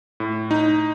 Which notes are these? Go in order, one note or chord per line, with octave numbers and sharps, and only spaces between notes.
A2
D#4